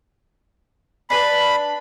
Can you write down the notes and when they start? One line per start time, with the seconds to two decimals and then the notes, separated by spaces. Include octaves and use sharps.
1.10 D4 B4 A5 B5